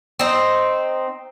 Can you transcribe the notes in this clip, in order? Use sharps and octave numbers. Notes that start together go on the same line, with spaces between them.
C4 D#4